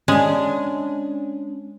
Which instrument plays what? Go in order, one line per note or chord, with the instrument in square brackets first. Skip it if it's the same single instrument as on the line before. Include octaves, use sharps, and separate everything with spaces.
[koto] G#3 [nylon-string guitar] C#4 D4